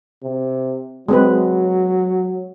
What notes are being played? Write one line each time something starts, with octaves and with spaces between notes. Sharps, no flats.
C3
F#3 G#3 C4 B4